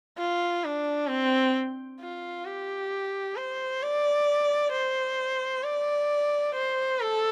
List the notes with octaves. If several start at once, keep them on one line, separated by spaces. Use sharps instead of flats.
F4
D4
C4
F4
G4
C5
D5
C5
D5
C5
A4